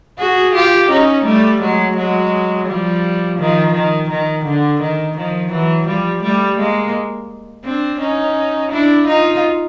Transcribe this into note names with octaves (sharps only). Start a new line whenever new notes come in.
F#4 G#4
F4 G4
C#4 D#4
G3 A3
F#3 G#3
F#3 G#3
F3 G3
D#3 F3
D#3
D#3
D3
D#3
D#3 F3
E3 F#3
F3 G3
G3 A3
G#3 A#3
C4 D4
C#4 D#4
D4 E4
D#4 F4